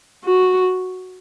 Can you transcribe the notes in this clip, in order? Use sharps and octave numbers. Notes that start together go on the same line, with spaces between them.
F#4